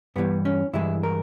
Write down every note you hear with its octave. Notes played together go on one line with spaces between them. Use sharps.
G2 E3 G3 B3
C#4
G2 E3 G#3 E4
A#4